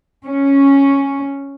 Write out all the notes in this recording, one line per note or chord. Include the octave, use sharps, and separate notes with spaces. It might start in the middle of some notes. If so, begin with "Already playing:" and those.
C#4